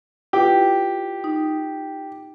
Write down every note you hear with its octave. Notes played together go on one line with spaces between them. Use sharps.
E4 F4 G4 B4
D#4